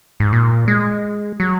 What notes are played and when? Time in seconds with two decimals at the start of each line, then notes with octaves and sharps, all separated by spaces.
0.20 G#2
0.33 A#2
0.68 G#3
1.40 F#3